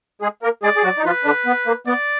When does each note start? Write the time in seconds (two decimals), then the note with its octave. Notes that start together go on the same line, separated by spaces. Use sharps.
0.22 G#3 G#4
0.43 A#3 A#4
0.63 G#3 G#4 D5
0.76 G#4
0.83 F#3 F#4
0.98 D#4
1.05 F3 F4 B4
1.24 D3 D4
1.46 B3
1.66 A#3
1.87 B3 D5